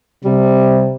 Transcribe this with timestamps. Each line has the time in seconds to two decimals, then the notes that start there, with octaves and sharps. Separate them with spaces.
0.25 C3 G3